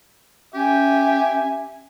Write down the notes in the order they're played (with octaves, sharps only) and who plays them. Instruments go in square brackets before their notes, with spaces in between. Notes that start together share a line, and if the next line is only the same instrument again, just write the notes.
[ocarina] C#4 [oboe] G4 [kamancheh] E5 G#5